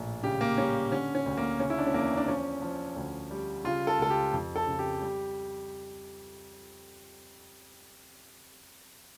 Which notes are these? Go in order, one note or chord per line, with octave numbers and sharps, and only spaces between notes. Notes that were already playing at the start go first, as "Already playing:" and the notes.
Already playing: A#1 A2
C#3 G4
A#3
G3 C#4
D3 C#4
C#4
D2
A#3
C#3 C#4
E4
D4
C#4
E2 A#3
D4
F3 C#4
F3
D2
G3
C#3 F4
A4
C#2 A4
G4
F2
A4
C#3
G4
G3